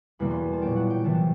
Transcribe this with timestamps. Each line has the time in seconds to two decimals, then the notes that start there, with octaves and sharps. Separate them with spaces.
0.19 E2 B2 G3 A#3 B5
0.31 C6
0.52 A5
0.62 A#2 F#3 A#3 G5
0.76 F#5
0.90 G5
1.04 C3 E3 A3 A5